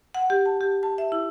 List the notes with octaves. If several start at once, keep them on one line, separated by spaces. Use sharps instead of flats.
F#5
G4
A5
G4
A5
E5
E4